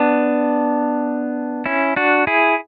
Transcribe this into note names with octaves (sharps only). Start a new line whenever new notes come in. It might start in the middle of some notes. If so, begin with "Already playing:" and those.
Already playing: B3 D4
C#4 E4
D4 F#4
E4 G#4